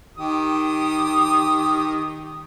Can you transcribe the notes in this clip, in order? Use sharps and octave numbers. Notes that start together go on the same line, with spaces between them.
D#3 G4 D#6